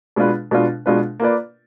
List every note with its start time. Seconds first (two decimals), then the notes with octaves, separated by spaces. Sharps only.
0.16 B2 G#3 D4 F4 B4
0.51 B2 G#3 D4 F4 B4
0.86 B2 G#3 D4 F4 B4
1.20 A#3 F4 B4 D5